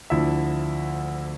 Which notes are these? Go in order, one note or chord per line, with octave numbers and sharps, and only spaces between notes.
D2 D3 F3 E4 E5